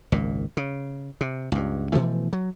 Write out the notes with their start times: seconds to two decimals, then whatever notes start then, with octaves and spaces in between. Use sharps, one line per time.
0.12 G#1 C#2 A#2
0.57 C#3
1.21 C3
1.52 C#2 G2
1.93 B2 E3 F3 A3
2.33 F#3